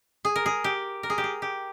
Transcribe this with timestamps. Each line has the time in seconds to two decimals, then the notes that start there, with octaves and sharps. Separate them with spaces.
0.25 G#4
0.36 A#4
0.46 G#4
0.64 G4
1.03 A#4
1.10 G#4
1.18 G4
1.24 G#4
1.42 G4